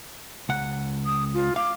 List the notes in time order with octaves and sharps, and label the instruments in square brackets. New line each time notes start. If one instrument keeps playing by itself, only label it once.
[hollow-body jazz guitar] C#2 F#5
[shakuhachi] D#6
F4
[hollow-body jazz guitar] F5 [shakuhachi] D6